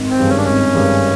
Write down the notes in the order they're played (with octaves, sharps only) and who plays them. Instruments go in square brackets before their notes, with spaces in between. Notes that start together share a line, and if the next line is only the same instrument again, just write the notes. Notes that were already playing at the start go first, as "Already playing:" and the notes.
Already playing: [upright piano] G#1
[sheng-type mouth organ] C4
[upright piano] G2 D#3 G#3
[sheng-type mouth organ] C#4
D4
[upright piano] G#1 [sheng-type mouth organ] C#4
[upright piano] G2 D#3 G#3